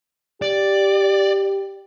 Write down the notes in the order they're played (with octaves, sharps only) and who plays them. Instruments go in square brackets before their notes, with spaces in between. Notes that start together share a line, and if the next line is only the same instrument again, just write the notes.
[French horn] G4 [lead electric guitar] D5